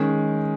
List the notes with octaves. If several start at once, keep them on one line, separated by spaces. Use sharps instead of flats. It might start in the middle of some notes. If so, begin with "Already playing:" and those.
Already playing: D#3 G#3 C#4